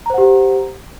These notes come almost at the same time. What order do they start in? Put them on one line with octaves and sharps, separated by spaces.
A#5 C5 F#5 G4